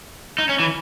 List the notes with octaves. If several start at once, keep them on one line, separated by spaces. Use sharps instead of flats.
D#4
C#4
E3